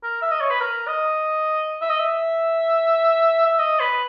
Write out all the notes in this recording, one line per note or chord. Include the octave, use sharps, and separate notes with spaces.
A#4
E5
D#5
C#5
B4
A#4
D#5
E5
D#5
E5
E5
D#5
B4